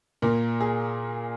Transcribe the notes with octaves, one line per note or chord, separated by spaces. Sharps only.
A#2 A#3 A#4
G#4